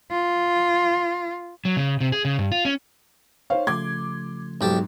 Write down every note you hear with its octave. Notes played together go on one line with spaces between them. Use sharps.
F4
F#3
C#3
C3
G#4
C#3
G2
F4
C#4
D#4 C5 C#5 F5
C#3 F3 A3 C6 D6 G#6
B1 G#2 G4 A5